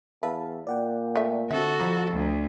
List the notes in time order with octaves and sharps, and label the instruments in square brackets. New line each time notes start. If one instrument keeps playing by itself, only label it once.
[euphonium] E2 [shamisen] B4 [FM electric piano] E5 F5 A5
[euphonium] A#2 [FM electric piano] D5 F#5 G5
[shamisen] A3 E5
[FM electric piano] D3 C4 [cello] F#4 A4 [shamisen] E5
[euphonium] F2 [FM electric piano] F3 A#5 [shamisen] G3
[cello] D2